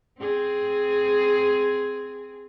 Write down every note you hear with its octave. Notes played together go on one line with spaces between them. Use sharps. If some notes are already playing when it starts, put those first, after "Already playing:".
C4 G#4